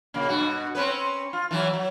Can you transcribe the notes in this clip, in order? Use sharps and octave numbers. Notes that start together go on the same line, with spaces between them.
A#2 C#3 A#3
G2 B2 F#4
C4 C#4 B4
F4
E3 F#3 E4
F#3